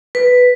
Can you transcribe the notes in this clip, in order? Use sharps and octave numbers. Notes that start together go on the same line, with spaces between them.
B4